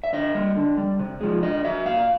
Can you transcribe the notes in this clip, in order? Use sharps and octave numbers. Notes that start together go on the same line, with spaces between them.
E5
D3 D#5
G3
D3
G3
C3
F3 G#3
D3 D#5
F#3 E5
A#2 F5